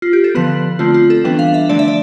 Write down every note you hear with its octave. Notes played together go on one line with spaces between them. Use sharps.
F4
G4
A4
D3 F3 B3 B4
D3 A3 C4 F4
F4
A4
E3 G3 B3 D4 B4
F5
E5
D3 F3 A3 D4 D5
E5
D5